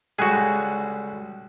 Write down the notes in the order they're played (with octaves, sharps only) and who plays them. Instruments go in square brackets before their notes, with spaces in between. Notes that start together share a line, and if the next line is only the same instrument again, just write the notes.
[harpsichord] C#2 D3 G3 [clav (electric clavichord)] F#4 G#4